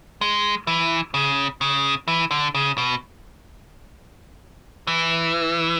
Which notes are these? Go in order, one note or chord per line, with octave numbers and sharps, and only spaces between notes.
G#3
E3
C#3
C#3
E3
D3
C#3
B2
E3